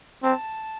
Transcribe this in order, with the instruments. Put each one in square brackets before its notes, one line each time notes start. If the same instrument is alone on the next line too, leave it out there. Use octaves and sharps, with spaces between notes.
[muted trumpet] C4 [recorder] A5